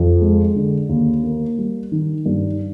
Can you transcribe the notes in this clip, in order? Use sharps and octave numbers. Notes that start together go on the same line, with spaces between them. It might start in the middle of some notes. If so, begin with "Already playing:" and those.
Already playing: F2
G#3
D3
D#2
A#3
G3
D#3
G2